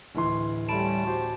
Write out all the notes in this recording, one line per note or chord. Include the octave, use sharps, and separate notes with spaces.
D1 E3 C6
G3 A3 C#4 A5 B5 D7 E7
F#4 G4 C5